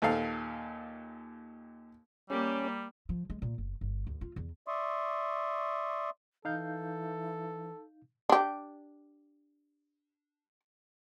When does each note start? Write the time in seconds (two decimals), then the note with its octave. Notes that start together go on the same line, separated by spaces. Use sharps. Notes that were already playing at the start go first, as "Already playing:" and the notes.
0.02 D#2 A#2 A4 F5
2.30 G3 A#3 C#4 G4
3.09 F3
3.30 G#3
3.42 A#2
3.58 F#1
3.81 G1
4.07 D2
4.21 F4
4.36 E2
4.68 D5 E5 C6 C#6 D#6
6.45 E3 D#4 A4 F5 G6
8.29 D4 G4